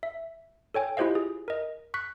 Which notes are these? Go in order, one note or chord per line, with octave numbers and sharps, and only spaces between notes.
E5
A4 C#5 G5 G#5
E4 F4 G4 C5 D#5 F5
G#4
A#4 D#5
C#6 F#6 B6